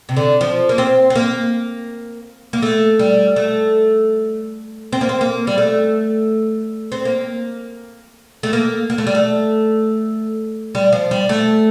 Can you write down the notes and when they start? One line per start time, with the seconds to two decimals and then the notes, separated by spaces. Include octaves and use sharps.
0.09 C3
0.16 D3
0.41 F3
0.69 A#3
0.78 C4
1.10 C4
1.15 A#3
2.53 A#3
2.62 A3
2.99 G3
3.36 A3
4.93 C4
5.01 A#3
5.09 C4
5.21 A#3
5.47 G3
5.58 A3
6.92 C4
7.05 A#3
8.43 A3
8.53 A#3
8.90 A#3
8.98 A3
9.07 G3
9.15 A3
10.75 G3
10.92 F3
11.11 G3
11.29 A3